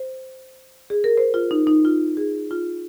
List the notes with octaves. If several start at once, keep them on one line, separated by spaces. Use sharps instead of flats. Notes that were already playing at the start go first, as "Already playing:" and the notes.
Already playing: C5
G#4
A#4
C5
F4
D#4
D#4
F4
G#4
F4